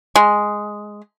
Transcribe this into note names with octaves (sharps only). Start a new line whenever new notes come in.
G#3